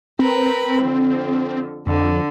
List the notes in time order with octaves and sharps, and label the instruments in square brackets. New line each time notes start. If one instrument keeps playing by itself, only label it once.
[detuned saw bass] C4 [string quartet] A#4 B4 B5
[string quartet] F2 D3
[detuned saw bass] F2 [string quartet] D3